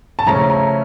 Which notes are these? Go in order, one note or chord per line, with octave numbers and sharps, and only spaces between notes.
A5
C#3 F3 A3 C#4 E4 A#5
A#5